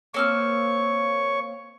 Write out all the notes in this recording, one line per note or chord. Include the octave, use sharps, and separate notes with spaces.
A#3 C4 C#5 C#6 F6